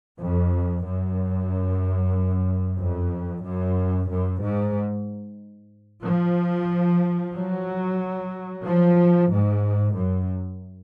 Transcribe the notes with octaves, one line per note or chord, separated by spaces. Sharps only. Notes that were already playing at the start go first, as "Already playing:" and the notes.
F2
F#2
F2
F#2
F#2
G#2
F3
F#3
F3
G#2
F#2